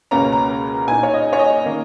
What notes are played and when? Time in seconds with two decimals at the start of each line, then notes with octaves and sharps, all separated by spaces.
0.11 C#2 B2 A#3 C#4 A#5
0.32 A#5
0.87 A#2 A#3 D#4 G#5
1.03 C#5
1.14 D#5
1.33 C#5
1.39 D#5
1.65 D#3 A#3 C#4